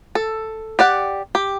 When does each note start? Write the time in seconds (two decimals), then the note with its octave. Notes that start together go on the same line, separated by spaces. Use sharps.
0.15 A4
0.79 G4 D5 F#5
1.35 G4